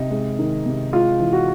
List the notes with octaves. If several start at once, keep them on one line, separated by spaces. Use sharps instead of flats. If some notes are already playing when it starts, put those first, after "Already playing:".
Already playing: C3 D#4
G#3
D#3
C3
G#3 F4
E3
F#4